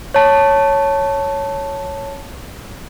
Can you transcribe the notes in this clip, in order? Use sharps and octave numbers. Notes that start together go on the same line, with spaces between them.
C#5 A5